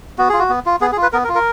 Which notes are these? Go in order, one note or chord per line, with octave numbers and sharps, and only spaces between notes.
B3 F#4
F4 G#4
F#4
B3
F4
B3 G#4
G#4
F4
B4
B3 A#4
A#4
F4
A#4